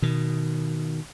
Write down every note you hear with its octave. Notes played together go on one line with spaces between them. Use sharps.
B2 D#3